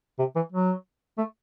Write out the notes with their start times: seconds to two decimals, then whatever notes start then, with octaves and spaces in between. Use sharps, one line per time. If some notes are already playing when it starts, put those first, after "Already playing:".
0.19 C3
0.36 E3
0.52 F#3
1.18 A3